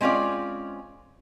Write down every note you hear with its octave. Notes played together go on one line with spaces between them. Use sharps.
G#3 C4 C#4 F4 D5